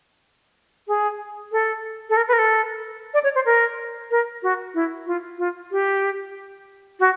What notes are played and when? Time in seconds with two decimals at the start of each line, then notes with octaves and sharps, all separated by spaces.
0.88 G#4
1.52 A4
2.09 A4
2.17 A#4
2.28 B4
2.33 A#4
2.39 A4
3.14 D5
3.24 C#5
3.35 C5
3.46 A#4
4.11 A#4
4.43 F#4
4.74 E4
5.07 F4
5.39 F4
5.71 G4
7.00 F#4